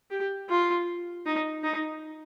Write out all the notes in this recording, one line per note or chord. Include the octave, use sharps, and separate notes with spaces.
G4
F4
D#4
D#4